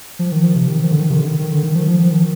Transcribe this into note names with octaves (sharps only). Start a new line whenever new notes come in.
F3
D#3
F3
C3
D#3
F3
D3
D#3
C3
D3
D#3
D#3
D3
D#3
F3
F3
F3
D#3